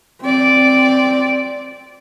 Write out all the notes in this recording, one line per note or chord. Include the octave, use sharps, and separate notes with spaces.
C4 D5